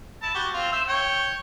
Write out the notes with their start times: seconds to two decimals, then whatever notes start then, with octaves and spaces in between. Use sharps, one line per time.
0.23 E4 A5
0.34 F#4 G4
0.54 C4 F4
0.72 C5 E5 E6
0.87 C#5 G5